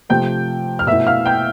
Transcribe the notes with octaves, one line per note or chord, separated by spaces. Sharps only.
C3 F3 A3 G5 G6
F6
B2 A3 E4 E5 E6
F5 F6
G5 G6